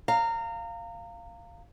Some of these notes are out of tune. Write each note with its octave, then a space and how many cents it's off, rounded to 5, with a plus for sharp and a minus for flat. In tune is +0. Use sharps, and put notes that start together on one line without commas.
F5 -5 A#5 -25